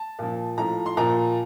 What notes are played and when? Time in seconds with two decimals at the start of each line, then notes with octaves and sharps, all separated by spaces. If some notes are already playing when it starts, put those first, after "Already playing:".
Already playing: A5
0.19 A#2 F3
0.58 A2 F3 A#5
0.86 C6
0.97 A#2 F3 A#5